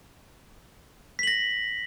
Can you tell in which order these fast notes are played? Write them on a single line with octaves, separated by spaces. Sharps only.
B6 F#7 A#6